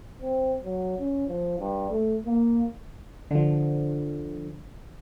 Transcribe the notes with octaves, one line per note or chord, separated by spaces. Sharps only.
C4
F#3
C#4
F3
G2
A3
A#3
D3 F3